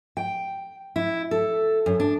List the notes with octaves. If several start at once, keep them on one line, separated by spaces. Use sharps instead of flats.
G5
E4
A4
F#2
D4